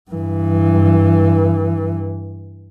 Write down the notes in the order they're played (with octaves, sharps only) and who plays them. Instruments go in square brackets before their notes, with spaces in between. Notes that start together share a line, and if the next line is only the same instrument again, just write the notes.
[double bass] G2 E3